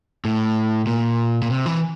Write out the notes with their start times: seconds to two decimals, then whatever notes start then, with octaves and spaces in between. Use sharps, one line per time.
0.25 A2
0.87 A#2
1.42 A#2
1.50 C3
1.66 E3